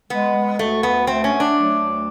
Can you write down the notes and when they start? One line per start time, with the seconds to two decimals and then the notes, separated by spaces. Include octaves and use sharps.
0.10 G#3 B3
0.36 G#3
0.59 D2 A3
0.83 D2 B3
1.07 A3 C4
1.24 C#4
1.32 A3
1.40 D4
1.56 F#3
1.80 D2